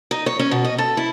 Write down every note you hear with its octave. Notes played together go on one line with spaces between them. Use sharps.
D#4
C#5
C#4
B2
D#5
A4
E4